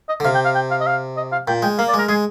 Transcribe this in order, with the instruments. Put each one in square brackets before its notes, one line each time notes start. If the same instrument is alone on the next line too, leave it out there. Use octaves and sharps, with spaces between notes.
[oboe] D#5
[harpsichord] D3
[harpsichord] C3 [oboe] F5
[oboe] G5
F5
G5
F5
D#5
F5
D#5
F5
[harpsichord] A#2 [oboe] G5
[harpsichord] G#3 [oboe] G5
[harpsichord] A#3 [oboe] F5
[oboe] D5
[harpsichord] G#3
[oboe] A#4
[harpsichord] G#3 [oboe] G#4